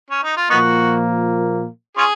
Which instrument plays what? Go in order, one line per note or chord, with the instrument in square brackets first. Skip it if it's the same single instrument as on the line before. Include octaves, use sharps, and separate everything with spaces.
[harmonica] C#4
D#4
F4
[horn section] A#2 F3 A#3 [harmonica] B3 D#4 F#4
[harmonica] C#4 F4 G#4